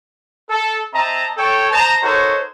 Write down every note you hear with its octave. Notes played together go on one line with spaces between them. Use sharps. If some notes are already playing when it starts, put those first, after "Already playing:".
A4
C4 D#5 E5 A5 A#5
A4 C#5 G5
C5 D#5 A5 A#5
D#4 F#4 A4 A#4 C5 C#5